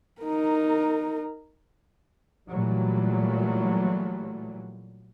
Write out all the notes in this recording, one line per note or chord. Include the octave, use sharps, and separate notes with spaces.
D#4 A#4
A#2 E3 F#3 G3 A3